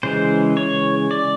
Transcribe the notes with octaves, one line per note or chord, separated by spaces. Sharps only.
C#3 E3 G#3 C5
C#5
D5